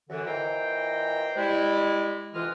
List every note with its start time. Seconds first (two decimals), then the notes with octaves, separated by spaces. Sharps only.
0.09 F#2 D3 E3
0.25 A#2 E3 C5 D#5 G5 A#5
1.37 G3 G#3 E4
2.34 D2 C3 E3 F4 D#5 F6